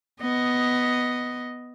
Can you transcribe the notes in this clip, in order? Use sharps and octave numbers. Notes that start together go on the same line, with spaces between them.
B3 D#5